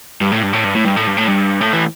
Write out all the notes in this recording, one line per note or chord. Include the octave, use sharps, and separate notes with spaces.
G2
A2
G2
A2
G2
A2
G2
A2
G2
A2
G2
A2
E3